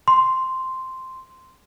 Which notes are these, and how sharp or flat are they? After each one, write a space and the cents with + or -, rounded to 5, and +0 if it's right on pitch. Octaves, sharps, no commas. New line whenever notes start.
C6 -5